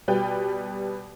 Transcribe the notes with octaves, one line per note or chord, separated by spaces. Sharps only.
B2 G3 B4 G5